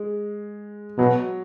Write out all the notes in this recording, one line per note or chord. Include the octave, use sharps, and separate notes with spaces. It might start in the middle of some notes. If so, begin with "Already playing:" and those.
Already playing: G#3
B2 F#3